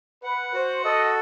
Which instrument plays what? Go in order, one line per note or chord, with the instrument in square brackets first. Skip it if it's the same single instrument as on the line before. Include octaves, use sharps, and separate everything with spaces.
[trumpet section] B4 [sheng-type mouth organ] F#5
[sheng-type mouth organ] F#4 [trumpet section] C5
[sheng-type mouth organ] A4 [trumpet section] D#5